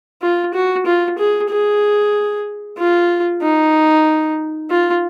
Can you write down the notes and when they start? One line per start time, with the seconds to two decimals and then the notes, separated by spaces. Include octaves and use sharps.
0.22 F4
0.53 F#4
0.86 F4
1.18 G#4
1.49 G#4
2.77 F4
3.42 D#4
4.70 F4